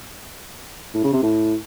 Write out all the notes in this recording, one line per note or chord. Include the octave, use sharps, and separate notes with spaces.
A2
C#3
C3
A2